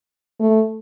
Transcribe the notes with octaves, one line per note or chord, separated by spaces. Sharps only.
A3